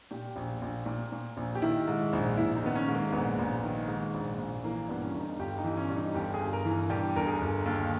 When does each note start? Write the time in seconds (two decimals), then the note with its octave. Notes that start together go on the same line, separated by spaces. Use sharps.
0.11 A#2 G4
0.36 A#1
0.62 A#1
0.86 A#2
1.12 A#2
1.37 A#1
1.55 G4
1.62 D#3 E4
1.88 G#2
2.13 A#1
2.38 A#1 E4
2.56 D#4
2.62 D#3 B3
2.75 C#4
2.88 G#2
2.94 A#3
3.12 A#1 B3
3.38 A#1
3.64 D#3
3.88 G#2
4.14 A#1
4.38 A#1
4.64 E3 A#3
4.89 G2 B3
5.02 C#4
5.14 G1
5.20 D#4
5.39 G1 G4
5.58 D#4
5.64 E3
5.77 C#4
5.90 G2
5.96 D#4
6.14 G1 G4
6.34 G#4
6.40 G1
6.53 A#4
6.65 E3
6.90 G2 G4
7.16 G1 A#4
7.28 G#4
7.41 G1
7.66 D#2